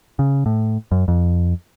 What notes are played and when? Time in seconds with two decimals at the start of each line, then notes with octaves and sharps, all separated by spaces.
0.19 C#3
0.46 A2
0.92 F#2
1.08 F2